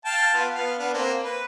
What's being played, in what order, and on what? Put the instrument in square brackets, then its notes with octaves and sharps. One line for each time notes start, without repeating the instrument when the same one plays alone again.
[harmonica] F5 G5 A5
B3 F4
B3 F5
B3 D4
A#3 C4
B4